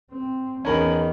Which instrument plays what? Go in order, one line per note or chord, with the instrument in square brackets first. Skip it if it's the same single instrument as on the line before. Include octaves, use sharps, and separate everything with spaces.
[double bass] C4
[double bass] E2 B3 [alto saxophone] D#3 [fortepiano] C#4 A#4 [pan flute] B5